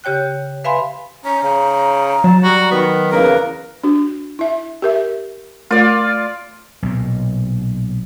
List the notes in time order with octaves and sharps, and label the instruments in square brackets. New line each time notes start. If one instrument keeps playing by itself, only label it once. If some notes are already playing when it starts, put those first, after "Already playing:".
[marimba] C#3 G4 C#5 G5 F#6
B4 E5 F5 G#5 B5 C6
[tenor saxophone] C#4 [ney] A#5
[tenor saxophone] C#3
[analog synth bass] F#3 [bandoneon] A5
[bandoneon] G3 [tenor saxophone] F#4
[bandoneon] D#3 [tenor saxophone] B3
[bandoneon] E2 C#3 A#4 [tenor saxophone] A#3 [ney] B4
[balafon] D4 F#4
E4 E5
G4 A#4 E5
[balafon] A3 A#4 [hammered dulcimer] F4 D5
[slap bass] B1 A#2